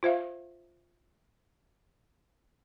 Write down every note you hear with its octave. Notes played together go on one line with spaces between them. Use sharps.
F4 C5 E5 F5